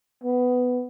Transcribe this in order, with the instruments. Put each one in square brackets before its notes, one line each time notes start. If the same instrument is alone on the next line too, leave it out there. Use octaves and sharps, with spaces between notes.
[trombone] B3